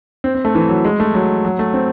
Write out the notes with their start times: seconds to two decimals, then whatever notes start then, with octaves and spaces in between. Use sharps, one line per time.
0.24 C4
0.35 C4
0.45 A3
0.55 E3
0.69 F#3
0.85 G#3
1.00 A3
1.14 F#3
1.45 F#3
1.59 A3
1.74 C4